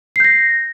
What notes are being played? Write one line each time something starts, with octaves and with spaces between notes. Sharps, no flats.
G6 A#6 C7